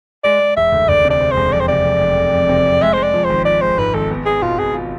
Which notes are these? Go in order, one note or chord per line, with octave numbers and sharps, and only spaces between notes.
G#3 D5
G#3
E1 E5
D2
D2 D5
C3
D5
C3
C5
E1
F2 D5
C5
C3 D5
F1
F1
F1
F2
C3
F2
G#3 E5
G#3 C5
D5
F3
C5
G#1
F3 D5
G#3 C5
G#2 B4
G#1 A4
B3
B3 G#4
B2 F4
B2 G#4
F4